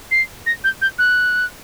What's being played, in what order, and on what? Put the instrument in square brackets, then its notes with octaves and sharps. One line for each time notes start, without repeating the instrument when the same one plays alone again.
[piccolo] C7
A#6
G6
G6
F#6